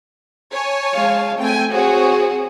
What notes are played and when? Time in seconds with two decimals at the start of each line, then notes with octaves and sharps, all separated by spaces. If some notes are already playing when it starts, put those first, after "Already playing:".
0.53 C#5 G#5 A5
0.94 G#3 F5
1.39 A3 C4 G5 G#5
1.71 C4 F#4 G#4 C#5